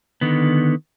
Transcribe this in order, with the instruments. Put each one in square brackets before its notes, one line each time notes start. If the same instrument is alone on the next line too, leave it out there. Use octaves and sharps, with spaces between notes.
[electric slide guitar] D3 D#3 B3